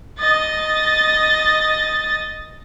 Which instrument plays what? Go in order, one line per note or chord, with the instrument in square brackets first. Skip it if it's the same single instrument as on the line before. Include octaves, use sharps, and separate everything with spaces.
[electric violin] D#5 A6